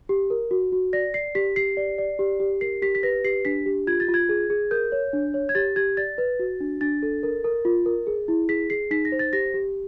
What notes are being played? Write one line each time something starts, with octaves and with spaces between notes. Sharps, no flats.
G4
A#4
F#4
F#4
D5 A#6
D5 C7
G4 B6
G4 C7
D5
D5
G4
G4
A#4 C7
G4 B6
B6
B4 A#6
G4 C7
D4 B6
G4
F4 G#6
A6
F4
G#6
G#4
G#4
A#4 G6
C#5
D4
C#5
G#6
G4 A6
G4 G#6
D5 A6
B4
F#4
D4
D4 A6
A4
A#4
A#4
F4
A#4
G#4
E4
G#4 B6
G#4 C7
D#4 B6
A#6
C5
A6
G4 A#6
G4